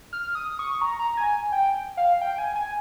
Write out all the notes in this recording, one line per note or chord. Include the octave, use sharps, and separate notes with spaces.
F6
D#6
C#6
A#5
A#5
G#5
G5
F5
G5
G#5
G#5